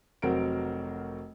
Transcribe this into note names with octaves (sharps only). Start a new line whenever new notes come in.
F1 F#3 C4 F#4 A#4 D7